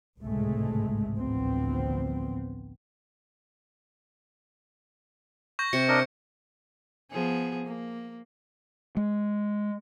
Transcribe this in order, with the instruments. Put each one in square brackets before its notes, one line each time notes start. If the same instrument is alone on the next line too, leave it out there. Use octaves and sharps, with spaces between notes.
[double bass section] G#1 C#2 A2 C3 G#3 A3
A1 D2 F3 B3 C4
[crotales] C#6 G6 A#6
[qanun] C3 [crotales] C#7
[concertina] D4 A#4 D#5
[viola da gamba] F3 B3 G#4
A#3
[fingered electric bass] G#3